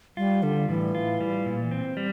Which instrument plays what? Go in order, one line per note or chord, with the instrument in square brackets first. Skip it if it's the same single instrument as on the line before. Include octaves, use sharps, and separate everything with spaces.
[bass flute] G3 [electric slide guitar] F4
[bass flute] D3 [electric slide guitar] G3
[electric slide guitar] A2 [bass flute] E3
[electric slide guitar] F4
G3
A#2
C4
G3